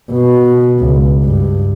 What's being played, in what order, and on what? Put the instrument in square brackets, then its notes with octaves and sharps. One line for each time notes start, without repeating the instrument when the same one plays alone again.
[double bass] B2
C#2
G2